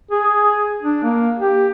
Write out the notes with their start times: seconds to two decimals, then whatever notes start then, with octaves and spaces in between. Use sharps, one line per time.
0.11 G#4
0.82 D4
1.03 A#3
1.39 G4